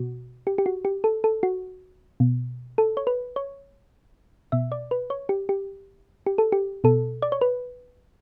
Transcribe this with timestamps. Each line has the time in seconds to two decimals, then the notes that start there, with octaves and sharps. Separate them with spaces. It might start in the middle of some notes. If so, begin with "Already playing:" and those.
Already playing: B2 F#4
0.47 G4
0.58 G4
0.66 F#4
0.85 G4
1.04 A4
1.24 A4
1.43 F#4
2.20 B2
2.78 A4
2.97 C#5
3.07 B4
3.36 C#5
4.52 B2 E5
4.72 D5
4.91 B4
5.10 C#5
5.29 G4
5.49 G4
6.26 G4
6.38 A4
6.52 G4
6.84 B2 A4
7.22 D5
7.32 C#5
7.41 B4